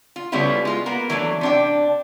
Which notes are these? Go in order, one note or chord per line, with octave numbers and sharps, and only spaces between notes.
F4
C#3 G3 A3 B3 E4 F4
G#3 F4
A#3 B3 A#4
E3 F#3 A3 D4
C3 D4 G5